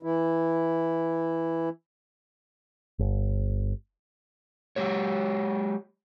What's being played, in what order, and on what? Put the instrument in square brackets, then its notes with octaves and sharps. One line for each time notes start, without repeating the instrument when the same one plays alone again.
[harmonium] E3 E4
[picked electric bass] G1
[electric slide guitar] F#3 G#3 G4 C#5